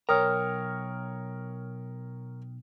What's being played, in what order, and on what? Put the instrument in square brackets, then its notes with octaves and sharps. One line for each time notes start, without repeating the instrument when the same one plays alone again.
[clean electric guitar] B1 A#5 [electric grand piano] A#4 C#5 [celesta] G5 D#6 F6